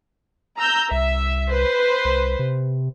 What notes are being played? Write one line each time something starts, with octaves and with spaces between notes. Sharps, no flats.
A#5 E6 G6
C2 E5
B4 C5
C2
C3